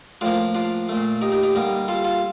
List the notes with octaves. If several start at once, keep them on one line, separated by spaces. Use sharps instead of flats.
A2 F3 A#3 D4 F4
D4 F4
A#2 A3
D#4 G4
D#4 G4
D#4 G4
D3 G3 A#3
F4 A4
F4 A4